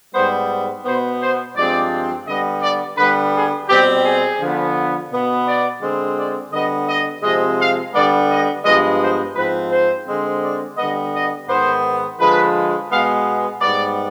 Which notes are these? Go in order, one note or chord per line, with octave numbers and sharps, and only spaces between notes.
G#2 G3 B3 C5
B2 B3 C5
C5
G2 F3 G#3 C4 D5
D3 G3 B3 D#5
D5
D3 G3 B3 B4
G#4
B2 G3 C4 G4
G#4
D3 F3 B3
B2 B3
D5
D3 G#3 C4
D5
D3 G3 B3 D#5
D#5
C3 F3 G#3 C4 D#5
F5
D3 G3 B3 D5
D#5
G2 F3 G#3 B3 D#5
C5
G#2 F3 C4 B4
C5
D3 G#3 C4
D5
D3 G3 B3 D#5
D#5
G#2 D#3 B3 C5
D3 F3 G#3 B4
B2 G#3 B3 F5
G#2 G3 B3 D5